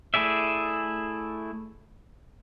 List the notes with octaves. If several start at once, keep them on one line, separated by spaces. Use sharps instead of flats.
A3 E4 G#4 D5 E5